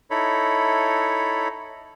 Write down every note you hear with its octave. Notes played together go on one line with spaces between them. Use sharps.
D#4 E4 A4 C#5 B5